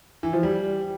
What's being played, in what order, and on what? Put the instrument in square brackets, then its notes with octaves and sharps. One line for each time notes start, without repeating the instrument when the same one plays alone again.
[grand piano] E3
F3
G3